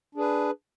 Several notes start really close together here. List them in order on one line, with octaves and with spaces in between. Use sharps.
D4 G#4 B4